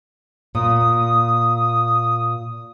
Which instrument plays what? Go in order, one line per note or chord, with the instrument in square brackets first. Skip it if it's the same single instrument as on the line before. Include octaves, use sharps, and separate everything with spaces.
[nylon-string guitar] A#2 [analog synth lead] D#6